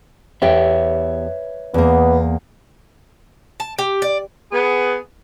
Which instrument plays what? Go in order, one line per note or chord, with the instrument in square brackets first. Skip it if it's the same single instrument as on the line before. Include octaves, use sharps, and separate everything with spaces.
[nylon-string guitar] E2 G4 G5 [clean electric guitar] B4 C#5 E5
[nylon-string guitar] E2 A#3 [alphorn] B3
[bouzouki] A5
G4
D5
[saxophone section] B3 G#4